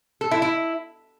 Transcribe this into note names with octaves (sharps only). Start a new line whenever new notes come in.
A4
E4
E4